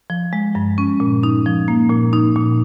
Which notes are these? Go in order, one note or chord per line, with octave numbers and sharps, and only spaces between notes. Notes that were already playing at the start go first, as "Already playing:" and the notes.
F3
G#3
G2
C#4
A#2
D#4
F3
A#3
A#2
D#4
A#2